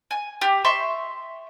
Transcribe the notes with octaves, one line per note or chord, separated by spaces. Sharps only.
G#5
G4
E5 C6 C#6